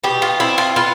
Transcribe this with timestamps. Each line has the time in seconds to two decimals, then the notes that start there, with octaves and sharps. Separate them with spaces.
0.04 B2 G4
0.22 F4
0.40 C4 E4
0.58 F4
0.76 B3 F4